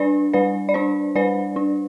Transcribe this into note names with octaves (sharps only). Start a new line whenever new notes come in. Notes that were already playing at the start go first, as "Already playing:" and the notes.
Already playing: G3 D4 B4 D5
G3 B4 D5
D5
D4 C5
G3 B4 D5
D4